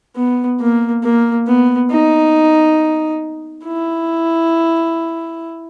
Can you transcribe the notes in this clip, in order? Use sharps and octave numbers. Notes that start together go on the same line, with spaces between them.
B3
A#3
A#3
B3
D#4
E4